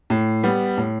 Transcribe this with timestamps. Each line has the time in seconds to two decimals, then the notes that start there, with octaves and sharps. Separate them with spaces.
0.10 A2
0.44 G3 B3
0.77 A2